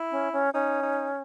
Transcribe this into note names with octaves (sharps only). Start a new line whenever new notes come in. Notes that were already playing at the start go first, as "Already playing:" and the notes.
Already playing: E4
C#4
C#4
C#4 D#4
D#4